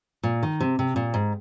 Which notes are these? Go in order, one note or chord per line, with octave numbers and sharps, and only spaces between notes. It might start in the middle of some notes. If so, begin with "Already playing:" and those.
A#2
D#3
C3
C3
A#2
G#2